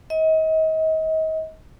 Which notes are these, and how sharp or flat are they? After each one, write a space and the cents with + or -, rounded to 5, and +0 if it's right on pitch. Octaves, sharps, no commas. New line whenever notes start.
D#5 +35